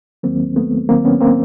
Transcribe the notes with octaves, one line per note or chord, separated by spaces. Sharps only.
D#2 D#3 F#3 A#3 C4
A3 B3
D#2 D#3 F#3 A#3 C4
B3 C#4
A#3 C4